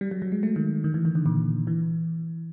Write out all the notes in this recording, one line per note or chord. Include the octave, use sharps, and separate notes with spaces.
G3
F#3
F#3
G#3
A3
D#3
D#3
E3
D#3
D3
A#2
E3